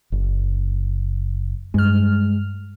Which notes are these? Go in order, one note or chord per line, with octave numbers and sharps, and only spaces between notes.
F#1
G2 G#3 F6